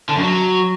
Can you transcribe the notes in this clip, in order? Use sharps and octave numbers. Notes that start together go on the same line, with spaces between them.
D3
F#2
F#3